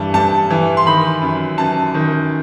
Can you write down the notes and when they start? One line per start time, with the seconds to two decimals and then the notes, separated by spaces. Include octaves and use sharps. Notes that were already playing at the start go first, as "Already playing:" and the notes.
Already playing: G2 E3 A5
0.14 G2 A5
0.50 E3
0.77 C6
0.86 D#3 B5
1.22 F#2
1.58 F#2 A5
1.94 D#3